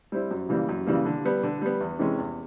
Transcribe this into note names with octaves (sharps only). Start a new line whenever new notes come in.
G3 C4 E4
F#2
C#3 E3 G3 A#3
F#2
C#3 E3 G3 A#3
D3
G3 B3
D3
G3 B3
E2
C3 E3 G#3 C#4
E2